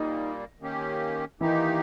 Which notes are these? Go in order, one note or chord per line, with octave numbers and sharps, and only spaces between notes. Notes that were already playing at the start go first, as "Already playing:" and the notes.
Already playing: A#2 G3 A#3 D#4 D#5
D#3 A#3 C#4 G4
D#3 E3 A#3 D#4 E4 G4